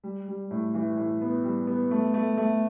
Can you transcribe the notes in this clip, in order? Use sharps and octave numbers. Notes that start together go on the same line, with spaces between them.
G3
G3
A2
E3
A2
B3
G3
B3
A3
A3
A3